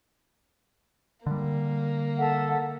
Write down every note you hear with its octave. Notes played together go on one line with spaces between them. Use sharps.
D3 G3 A#3
A4 E5 F#5